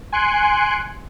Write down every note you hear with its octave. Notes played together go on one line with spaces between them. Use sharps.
G#5 C6 F#6 C#7 D7